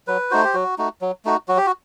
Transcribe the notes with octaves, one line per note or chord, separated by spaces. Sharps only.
F#3 B4
A3 D#4 F#4 C5
G4
F#3 F#4
A3 D#4 F#4
F#3
A3 D#4 F#4
F#3 F#4
G4
F#4